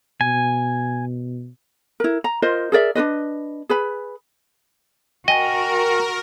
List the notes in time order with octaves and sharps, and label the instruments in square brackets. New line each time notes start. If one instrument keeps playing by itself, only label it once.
[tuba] B2 [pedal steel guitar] G#5
[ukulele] E4 A#4
A#5
F4 A#4 C5 D#5
G#4 A#4 D5 E5
D4 F#4 B4 D#5
G#4 B4 B5
[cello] F#4 [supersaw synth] A#4 [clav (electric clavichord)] D#5 [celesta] G5 G#5 A#6